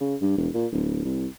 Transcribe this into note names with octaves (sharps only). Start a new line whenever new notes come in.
C#3
G2
E1
A#2
D1
C2